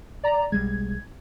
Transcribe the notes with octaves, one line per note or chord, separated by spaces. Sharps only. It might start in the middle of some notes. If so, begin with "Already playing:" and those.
D5 A#5
B1 G3 G#3 G#6